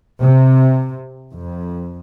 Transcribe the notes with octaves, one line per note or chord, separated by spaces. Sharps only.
C3
F2